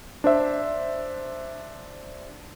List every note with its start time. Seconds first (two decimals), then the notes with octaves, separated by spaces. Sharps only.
0.24 D4 C5 E5